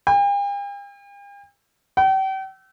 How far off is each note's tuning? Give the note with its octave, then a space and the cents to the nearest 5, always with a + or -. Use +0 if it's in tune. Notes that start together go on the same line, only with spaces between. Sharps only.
G5 +45
G5 -40